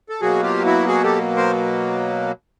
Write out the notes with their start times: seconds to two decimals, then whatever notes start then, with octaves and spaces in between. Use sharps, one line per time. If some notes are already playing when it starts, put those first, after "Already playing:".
0.09 A4
0.21 B2 F#3 A#3 F#4 G#4
0.43 F4 G4
0.66 E4 F#4
0.87 F#4 G#4
1.04 G4 A4
1.36 A#4 C5